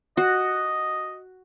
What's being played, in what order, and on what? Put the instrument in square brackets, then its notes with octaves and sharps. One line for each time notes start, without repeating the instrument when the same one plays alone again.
[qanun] F#4 [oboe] D#5